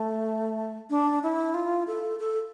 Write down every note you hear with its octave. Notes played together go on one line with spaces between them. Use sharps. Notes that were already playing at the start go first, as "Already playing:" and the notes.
Already playing: A3
D4
E4
F4
A4
A4